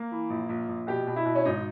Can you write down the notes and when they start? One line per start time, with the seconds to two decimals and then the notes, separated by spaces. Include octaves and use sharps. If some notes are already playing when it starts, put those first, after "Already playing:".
Already playing: A#3
0.12 E3
0.30 A#1
0.49 A#1
0.68 A#1
0.87 B2 G4
1.07 B2
1.16 E4
1.25 B2
1.35 C#4
1.45 G#1 D#4